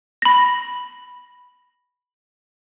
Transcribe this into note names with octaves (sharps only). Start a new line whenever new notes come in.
B5 A#6